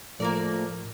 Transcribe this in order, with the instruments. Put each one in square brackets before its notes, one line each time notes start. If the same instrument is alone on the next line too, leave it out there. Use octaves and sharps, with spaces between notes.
[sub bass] A2 [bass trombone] F3 [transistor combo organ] A3 [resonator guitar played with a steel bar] A#3 A#4 D5